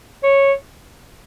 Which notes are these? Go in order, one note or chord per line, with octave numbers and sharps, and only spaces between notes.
C#5